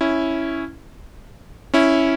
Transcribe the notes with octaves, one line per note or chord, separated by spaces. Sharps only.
C#4 E4
C#4 E4